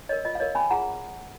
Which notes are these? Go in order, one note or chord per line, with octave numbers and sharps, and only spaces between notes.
A#4 C#5 D#5
F4 D#5
F5
A#4 C#5 D#5
C#4 G#5 B5
F4 G#4 F#5 A#5